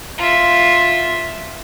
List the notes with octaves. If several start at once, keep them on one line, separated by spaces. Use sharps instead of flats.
F4 E5